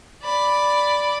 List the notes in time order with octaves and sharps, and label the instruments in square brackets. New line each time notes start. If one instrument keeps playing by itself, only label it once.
[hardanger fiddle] D5 B5